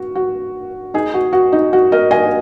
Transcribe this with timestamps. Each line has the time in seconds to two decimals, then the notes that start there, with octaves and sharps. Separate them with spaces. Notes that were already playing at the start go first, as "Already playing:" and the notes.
Already playing: F#4
0.15 F#4
0.94 D#4 G#4
1.14 F#4
1.33 F#4
1.52 D#4
1.73 F#4
1.92 A#4 D#5
2.11 D#5 G#5